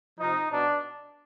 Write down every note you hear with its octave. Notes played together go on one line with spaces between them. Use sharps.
C3 F3 D#4
B2 D4